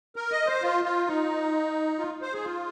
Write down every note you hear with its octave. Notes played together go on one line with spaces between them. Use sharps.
A#4
D#5
C5
F4
F4
D#4
F4
C5
G#4
F4